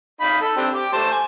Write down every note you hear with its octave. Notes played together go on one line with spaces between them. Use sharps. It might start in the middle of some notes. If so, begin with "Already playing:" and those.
D#4 F5 B5
A4
C4 D4 G4
G4 D6
A3 C5 A5
G#5